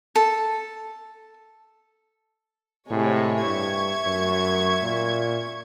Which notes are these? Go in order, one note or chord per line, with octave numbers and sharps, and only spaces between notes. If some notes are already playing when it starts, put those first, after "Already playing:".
A4
A2 C3 G#3 C#5
G2 E5 C#6 G#6
F#2
A#2